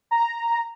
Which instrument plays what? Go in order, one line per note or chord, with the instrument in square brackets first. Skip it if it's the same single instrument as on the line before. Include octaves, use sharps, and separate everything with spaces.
[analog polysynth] A#5